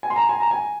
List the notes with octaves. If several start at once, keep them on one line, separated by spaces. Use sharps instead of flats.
G#5
C6
A#5
G#5
A#5
G#5